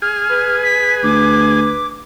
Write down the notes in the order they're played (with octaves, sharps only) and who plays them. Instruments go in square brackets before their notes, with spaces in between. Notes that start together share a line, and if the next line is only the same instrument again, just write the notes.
[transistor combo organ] G#4 G#5 [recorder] F6
[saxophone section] B4
[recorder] B6
[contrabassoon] D2 [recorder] D6